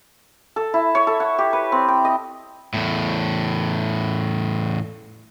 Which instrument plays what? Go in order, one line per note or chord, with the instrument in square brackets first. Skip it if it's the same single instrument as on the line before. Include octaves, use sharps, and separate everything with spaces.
[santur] A4
E4
C#5
A4
F#5
G4
B4
C4
G5
D#5
[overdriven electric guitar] E2 A2